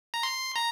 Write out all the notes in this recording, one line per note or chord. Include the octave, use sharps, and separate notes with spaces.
A#5
C6
A#5